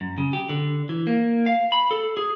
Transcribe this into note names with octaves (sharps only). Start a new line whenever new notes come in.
F#2
C#3
G4
D3
E3
A#3
F5
B5
A4
G#4